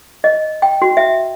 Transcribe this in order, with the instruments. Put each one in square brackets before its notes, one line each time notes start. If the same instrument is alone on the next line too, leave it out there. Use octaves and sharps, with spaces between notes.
[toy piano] D#5
G5
F#4
E5